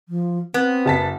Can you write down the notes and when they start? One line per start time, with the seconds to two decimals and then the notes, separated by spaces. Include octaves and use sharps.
0.09 F3
0.54 B3 C4
0.86 F#1 A5 B6